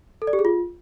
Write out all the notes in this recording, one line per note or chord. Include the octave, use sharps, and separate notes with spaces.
A4
D5
G4
G#4
F4